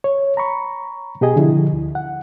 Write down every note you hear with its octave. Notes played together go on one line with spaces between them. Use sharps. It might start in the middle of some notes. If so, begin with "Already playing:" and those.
C#5
A#5 B5 C#6
B2 G4 G#4 D#5 G#5
D3 F3 E4
D2
F#5